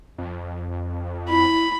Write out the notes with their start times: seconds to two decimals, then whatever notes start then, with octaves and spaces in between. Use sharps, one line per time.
0.18 F2
1.29 E4 B5